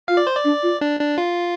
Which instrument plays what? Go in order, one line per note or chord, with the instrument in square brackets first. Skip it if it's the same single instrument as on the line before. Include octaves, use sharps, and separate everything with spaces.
[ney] F4 [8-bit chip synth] F5
[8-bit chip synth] D5
C5
D5
[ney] D4
F4
[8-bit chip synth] D4
D4
F4